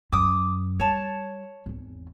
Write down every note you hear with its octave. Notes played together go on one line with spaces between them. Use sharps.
F#2 D6 D#6
G3 C#5 A5
G#1 E2